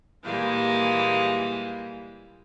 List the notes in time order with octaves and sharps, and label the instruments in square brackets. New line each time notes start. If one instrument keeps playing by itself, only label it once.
[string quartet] A#2 E3 G3 G#3 A#3